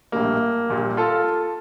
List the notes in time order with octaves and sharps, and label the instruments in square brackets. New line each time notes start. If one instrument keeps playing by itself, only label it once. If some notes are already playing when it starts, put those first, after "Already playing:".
[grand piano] A#1 A2 G3 A#3
A#1 A#2 G3
F4 A4